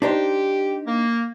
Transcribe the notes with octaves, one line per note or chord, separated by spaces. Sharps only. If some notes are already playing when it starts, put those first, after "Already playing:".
D4 D#4 G4 C5
A#3